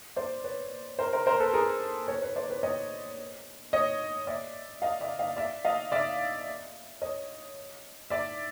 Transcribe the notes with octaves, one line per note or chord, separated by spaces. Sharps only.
C5 D5
B4 C#5
A#4 C5
A#4 C5
A#4 C5
A4 B4
G#4 A#4
B4 C#5
B4 C#5
C5 D5
B4 C#5
C#5 D#5
C#5 D#5
D5 E5
D#5 F5
D5 E5
D#5 F5
D5 E5
D#5 F5
D5 E5
C#5 D#5
D5 E5